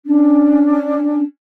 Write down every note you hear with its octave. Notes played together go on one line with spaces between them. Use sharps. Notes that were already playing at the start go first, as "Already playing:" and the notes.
C#4 D4